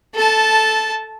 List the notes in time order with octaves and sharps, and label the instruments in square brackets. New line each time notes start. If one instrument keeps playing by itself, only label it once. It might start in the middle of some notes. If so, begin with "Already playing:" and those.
[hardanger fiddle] A4 A5